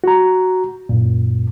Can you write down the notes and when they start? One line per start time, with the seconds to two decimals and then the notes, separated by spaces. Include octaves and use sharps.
0.04 F#4 A#5
0.89 F#2 A#2